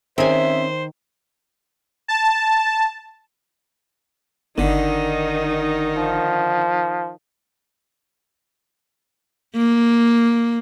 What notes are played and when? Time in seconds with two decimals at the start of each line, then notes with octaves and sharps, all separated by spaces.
0.18 D#3 C4 C#4 G#4 C5 E5 G#5
2.08 A5
4.58 G1 D3 D#3 D#4
5.98 F3
9.56 A#3